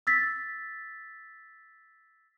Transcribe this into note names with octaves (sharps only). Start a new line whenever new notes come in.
E6 A6 B6